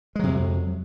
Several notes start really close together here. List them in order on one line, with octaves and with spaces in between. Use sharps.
G#3 F#3 C3 F2